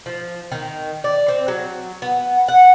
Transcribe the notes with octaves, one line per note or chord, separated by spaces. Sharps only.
F3
D#3
D5
C4
F#3
B3
F#5